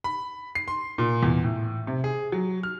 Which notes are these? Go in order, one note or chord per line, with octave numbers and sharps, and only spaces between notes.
B5
C7
C6
A#2
E2
A2
C3
G#4
F#3
F6